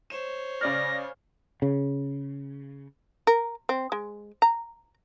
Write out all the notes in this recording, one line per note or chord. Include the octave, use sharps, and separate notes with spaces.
C5 C#5 E7
C#3 D5 F6 A#6
C#3
A#4
C4
G#3
A#5